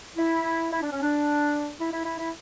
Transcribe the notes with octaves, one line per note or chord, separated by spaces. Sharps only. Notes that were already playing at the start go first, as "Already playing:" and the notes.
E4
E4
D4
C#4
D4
E4
E4
E4
E4